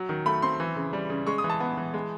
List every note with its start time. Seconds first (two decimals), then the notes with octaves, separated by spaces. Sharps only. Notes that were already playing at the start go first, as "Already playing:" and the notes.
Already playing: F#3
0.09 D#3
0.26 A3 B5
0.42 C4 C6
0.60 E3
0.76 C#3
0.93 G3
1.09 C#3
1.27 G#3 C#6
1.38 D#6
1.44 E3
1.50 A5
1.60 B3
1.77 E3
1.94 G#3